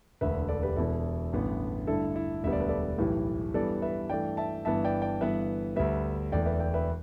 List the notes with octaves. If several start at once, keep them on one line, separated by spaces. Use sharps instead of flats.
E1 D2 D3 B4 E5
A4 D5
G4 B4
E1 E2 B2 E4 A4
A1 G2 D3 B3
G2 D3 A3 E4 A4
E4
E1 D2 D3 G3 B3 E5
D5
B4
A4 D5
B1 A2 E3 G4 B4
G2 E3 G3 B3 A4 D5
B4 E5
G2 E3 A3 D5 G5
E5 A5
G1 G2 E3 B3 E5 A5
D5 G5
D5 G5
G1 G2 E3 B3 B4 E5
D2 D3 G3 B4 E5
E1 E2 E3 A3 D5 G5
B4 E5
D5 G5
B4 E5